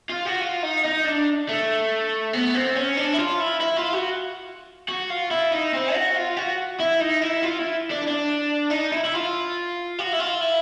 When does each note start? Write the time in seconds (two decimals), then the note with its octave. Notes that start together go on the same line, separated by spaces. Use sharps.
0.10 F4
0.26 F#4
0.42 F4
0.63 D#4
0.85 D#4
1.06 D4
1.49 A3
2.33 B3
2.55 C4
2.76 C#4
2.97 D4
3.14 E4
3.18 F4
3.40 E4
3.61 E4
3.77 F4
3.93 F#4
4.88 F#4
5.10 F4
5.31 E4
5.52 D#4
5.74 C4
5.94 F#4
6.16 F4
6.37 F#4
6.80 E4
7.00 D#4
7.22 E4
7.43 F4
7.59 E4
7.91 D4
8.07 D4
8.71 D#4
8.92 E4
9.05 E4
9.14 F4
9.99 F#4
10.13 E4
10.19 F4
10.41 E4